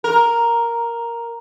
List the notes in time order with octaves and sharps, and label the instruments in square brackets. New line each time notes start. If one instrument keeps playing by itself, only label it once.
[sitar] A#4